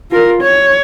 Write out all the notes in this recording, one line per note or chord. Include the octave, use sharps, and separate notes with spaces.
F4 A#4
C#5